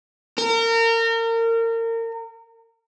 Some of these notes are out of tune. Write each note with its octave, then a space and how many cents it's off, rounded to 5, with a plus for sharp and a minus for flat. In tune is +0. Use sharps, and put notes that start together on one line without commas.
A#4 -30